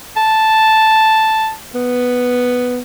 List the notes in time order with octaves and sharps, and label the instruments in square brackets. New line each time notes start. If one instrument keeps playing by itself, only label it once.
[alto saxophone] A5
B3